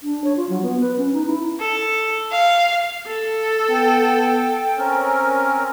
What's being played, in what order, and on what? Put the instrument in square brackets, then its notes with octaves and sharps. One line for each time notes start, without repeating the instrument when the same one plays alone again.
[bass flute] D4
C#5
F4
F#3
B3
B4
C#4
D#4
E4
[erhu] A4
F5
[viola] A4
[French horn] B3 [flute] G5
[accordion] C4 C#4 A#4 [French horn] C5